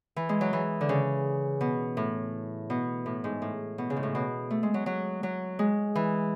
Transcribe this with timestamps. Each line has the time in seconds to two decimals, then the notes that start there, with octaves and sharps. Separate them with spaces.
0.16 E3
0.29 G#3
0.41 F#3
0.53 E3
0.81 D3
0.89 C#3
1.61 B2
1.97 A2
2.70 B2
3.06 A2
3.24 G#2
3.42 A2
3.78 B2
3.90 C#3
3.96 G#2
4.03 A2
4.15 B2
4.51 A3
4.63 G#3
4.74 F#3
4.86 F#3
5.23 F#3
5.59 G#3
5.95 E3